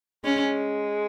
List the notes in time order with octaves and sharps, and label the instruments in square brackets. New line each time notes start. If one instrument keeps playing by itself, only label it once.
[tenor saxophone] G#3 [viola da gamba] C#4